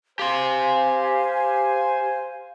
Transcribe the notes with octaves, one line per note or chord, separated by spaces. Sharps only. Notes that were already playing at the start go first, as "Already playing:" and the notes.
G4 C5 F5 G#5 C6